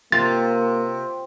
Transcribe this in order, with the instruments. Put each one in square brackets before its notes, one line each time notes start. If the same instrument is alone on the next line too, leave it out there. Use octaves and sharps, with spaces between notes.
[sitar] C3 [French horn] A#3 [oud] F4 [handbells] A6